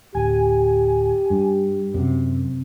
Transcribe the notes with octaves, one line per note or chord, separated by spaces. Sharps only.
D1 G4 G#5
G2
F#2 C3